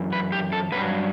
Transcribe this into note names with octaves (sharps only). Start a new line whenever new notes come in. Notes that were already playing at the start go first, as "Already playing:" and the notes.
Already playing: F#2 E3
B4
G4
A4
G2 F#3 B4